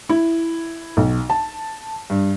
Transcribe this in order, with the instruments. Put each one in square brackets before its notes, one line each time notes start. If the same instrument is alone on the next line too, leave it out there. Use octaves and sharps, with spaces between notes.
[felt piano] E4
B1
A5
G2